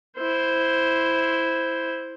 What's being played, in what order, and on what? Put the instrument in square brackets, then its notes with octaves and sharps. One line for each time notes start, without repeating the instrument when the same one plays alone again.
[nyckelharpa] E4 C5